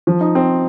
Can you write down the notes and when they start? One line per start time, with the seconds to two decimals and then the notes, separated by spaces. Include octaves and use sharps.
0.07 F3
0.21 D#4
0.35 C4